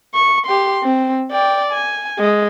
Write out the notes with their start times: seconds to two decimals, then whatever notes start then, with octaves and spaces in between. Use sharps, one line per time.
0.14 C#6
0.46 G4 C6
0.83 C4
1.31 D5 G5
1.72 G#5
2.19 G#3